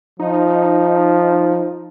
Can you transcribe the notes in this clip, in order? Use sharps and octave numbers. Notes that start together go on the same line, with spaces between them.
F3 D#4